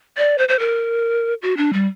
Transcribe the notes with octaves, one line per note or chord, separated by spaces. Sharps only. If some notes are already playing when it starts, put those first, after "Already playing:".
D5
C5
C5
A#4
F#4
D4
G3